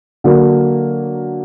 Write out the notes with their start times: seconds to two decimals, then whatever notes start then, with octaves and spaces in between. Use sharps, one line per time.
0.24 D3 F#3 A#3